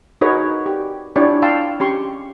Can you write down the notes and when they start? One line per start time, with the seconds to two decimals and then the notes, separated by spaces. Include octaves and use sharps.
0.21 D#4 F#4 G#4 A#4 B4 C#5
0.66 G4
1.16 D4 E4 F4 G4 C#5 D5
1.42 F5 G5 A5 C6 E6
1.80 C#4 G4 C6 C#6